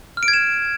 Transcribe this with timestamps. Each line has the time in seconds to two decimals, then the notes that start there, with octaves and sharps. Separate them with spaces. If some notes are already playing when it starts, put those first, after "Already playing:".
0.17 F6
0.23 D7
0.28 G#6
0.33 E7